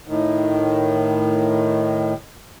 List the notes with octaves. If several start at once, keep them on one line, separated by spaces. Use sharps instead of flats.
A2 D#3